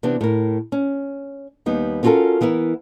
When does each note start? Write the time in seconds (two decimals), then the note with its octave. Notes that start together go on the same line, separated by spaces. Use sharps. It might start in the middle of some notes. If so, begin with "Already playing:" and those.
0.03 C3 E3 B3 D4
0.21 A2 A#4
0.72 C#4
1.66 D#2 G3 B3 D#4
2.03 B3 C#4 F4 F#4 A4 A#4
2.41 E3 B3 E4 A#4